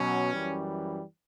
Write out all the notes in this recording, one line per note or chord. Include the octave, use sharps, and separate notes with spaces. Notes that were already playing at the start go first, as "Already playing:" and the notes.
Already playing: B2 F#3 C#4
F#2 E3 G3